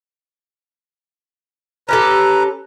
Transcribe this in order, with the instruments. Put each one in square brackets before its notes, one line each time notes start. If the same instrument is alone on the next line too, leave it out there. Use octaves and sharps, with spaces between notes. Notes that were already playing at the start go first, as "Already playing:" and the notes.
[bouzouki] C#4 G4 A4 [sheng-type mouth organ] B4 A#5